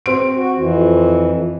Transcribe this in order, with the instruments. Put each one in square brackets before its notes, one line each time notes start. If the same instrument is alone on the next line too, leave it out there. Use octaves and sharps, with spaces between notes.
[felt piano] C4 D7
[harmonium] F#4
F2 E3